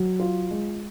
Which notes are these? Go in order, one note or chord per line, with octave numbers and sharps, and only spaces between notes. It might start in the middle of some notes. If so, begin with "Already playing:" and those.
Already playing: F#3
F4
G#3